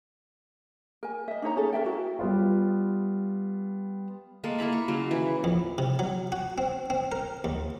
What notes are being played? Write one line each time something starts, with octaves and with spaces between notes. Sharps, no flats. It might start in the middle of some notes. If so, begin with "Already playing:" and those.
A#4 G#5
D#5 E5
D4 D#4 C#5 A#5
C#4 G#4 A4
A#4 D5 E5 G5
E4 F#4
G3 B3 F4
G#3 A#3 A4
A#3 E4 A#5 B5
C#6
C#3 F#3 C6
E3
F2
C3
F#3
F#4
C4
C4
A#4
D#2